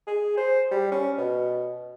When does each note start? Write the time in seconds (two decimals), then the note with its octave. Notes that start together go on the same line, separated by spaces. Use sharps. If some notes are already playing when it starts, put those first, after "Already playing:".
0.07 G#4
0.37 C5
0.71 G3
0.92 C#4
1.18 B2